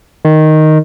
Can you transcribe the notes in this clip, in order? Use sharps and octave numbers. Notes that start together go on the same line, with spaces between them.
D#3